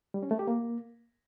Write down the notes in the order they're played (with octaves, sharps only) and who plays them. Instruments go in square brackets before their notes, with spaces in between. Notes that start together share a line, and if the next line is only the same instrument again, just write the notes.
[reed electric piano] G3
C#4
A3
G4
A#3